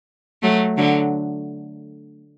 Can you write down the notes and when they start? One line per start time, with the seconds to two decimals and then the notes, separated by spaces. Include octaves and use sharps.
0.43 F#3 A3
0.78 D3 F#3